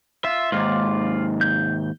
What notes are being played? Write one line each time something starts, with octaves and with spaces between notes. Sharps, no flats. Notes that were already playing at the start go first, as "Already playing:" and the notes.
F4 E5
D#2 G#2 F4 D5
G6